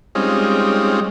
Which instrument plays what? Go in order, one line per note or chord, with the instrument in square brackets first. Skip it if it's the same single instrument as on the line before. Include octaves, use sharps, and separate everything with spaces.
[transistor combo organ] G3 G#3 C4 C#4 D#4 F4